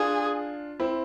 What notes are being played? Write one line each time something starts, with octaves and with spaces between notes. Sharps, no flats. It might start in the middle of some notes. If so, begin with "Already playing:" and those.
Already playing: D4 F4 G#4
C4 E4